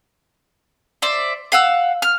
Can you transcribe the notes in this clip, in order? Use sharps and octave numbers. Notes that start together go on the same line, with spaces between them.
C5 D5 E5
F5 F#5 E6
F6